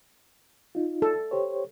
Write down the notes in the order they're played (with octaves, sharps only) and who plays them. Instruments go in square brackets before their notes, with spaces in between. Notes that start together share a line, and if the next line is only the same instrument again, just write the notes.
[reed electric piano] D#4 F4
[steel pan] A4
[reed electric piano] G4 C5 C#5